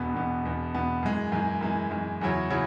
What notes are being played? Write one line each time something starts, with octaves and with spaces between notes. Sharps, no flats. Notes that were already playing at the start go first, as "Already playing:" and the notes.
Already playing: E1 E2 B2 B3
E1 E2 B2 B3
E1 E2 B2 B3
E1 E2 B2 B3
F#2 E3 G#3
F#2 E3 G#3
F#2 E3 G#3
F#2 E3 G#3
E2 C#3 F#3 E4 C#5
C#3 F#3 E4 C#5